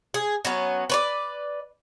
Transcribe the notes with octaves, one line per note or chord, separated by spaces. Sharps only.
G#4
F#3 B3 C#4
B4 C#5 D5